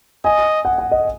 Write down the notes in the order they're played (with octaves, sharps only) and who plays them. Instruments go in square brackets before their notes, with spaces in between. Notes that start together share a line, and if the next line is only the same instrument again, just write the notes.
[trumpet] D#5 [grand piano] G#5
[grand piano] F#5
F#5
D#5